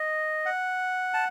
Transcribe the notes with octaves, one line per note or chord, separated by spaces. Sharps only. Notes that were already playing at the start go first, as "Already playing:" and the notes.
Already playing: D#5
F#5
A5